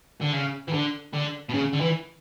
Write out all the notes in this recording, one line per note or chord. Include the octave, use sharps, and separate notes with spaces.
D3
C#3
E3
D3
D3
B2
C#3
D3
E3